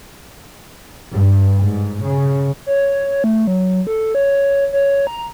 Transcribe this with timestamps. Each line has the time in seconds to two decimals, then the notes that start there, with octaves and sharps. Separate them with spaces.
1.12 G2
1.60 G#2
2.02 C#3
2.66 C#5
3.24 A3
3.47 F#3
3.87 A4
4.15 C#5
4.73 C#5
5.07 A#5